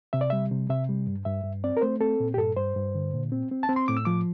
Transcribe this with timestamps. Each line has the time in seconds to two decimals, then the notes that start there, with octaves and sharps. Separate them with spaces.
0.13 C3 E5
0.21 D5
0.30 G3 E5
0.51 C3
0.70 C3 E5
0.89 G3
1.07 G2
1.25 G2 E5
1.44 G2
1.64 C4 D5
1.77 A#4
1.81 A3 C5
2.01 C4 A4
2.20 A#2
2.34 G4
2.38 G2 A4
2.56 G2 C5
2.76 G2
2.95 D3
3.14 A#2
3.32 C4
3.51 C4
3.63 A5
3.69 C4
3.76 C6
3.88 A2 D6
3.97 E6
4.05 F3 D6